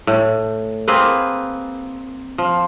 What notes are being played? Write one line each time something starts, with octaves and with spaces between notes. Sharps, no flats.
A2
A#3 C4 G#4 B4
F3